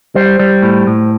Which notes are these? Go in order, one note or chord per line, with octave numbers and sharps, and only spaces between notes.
G3 C5
G3
A2
A2